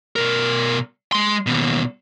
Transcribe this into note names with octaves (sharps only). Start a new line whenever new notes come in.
B2 A#4
G#3 C6
D#2 B2